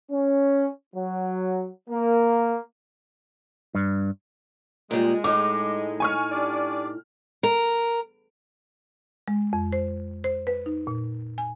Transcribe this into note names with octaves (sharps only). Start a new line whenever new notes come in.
C#4
F#3
A#3
G2
A#2 G3 G#3
A2 D#4 D6
G#5 C#6 F6
D4 G4 D5
A#4
G#3
F2
C5
C5
B4
D#4
A#2
G#5